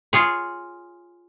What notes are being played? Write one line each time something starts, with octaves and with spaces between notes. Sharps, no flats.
F4 G#4 C#5